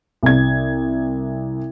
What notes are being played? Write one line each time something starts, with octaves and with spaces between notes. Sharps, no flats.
C2 G#6